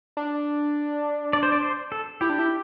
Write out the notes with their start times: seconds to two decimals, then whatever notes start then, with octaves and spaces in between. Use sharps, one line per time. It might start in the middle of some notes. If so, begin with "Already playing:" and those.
0.17 D4
1.33 D5
1.43 C5
1.52 D5
1.63 C5
1.92 A4
2.21 E4 G4
2.30 D4
2.39 E4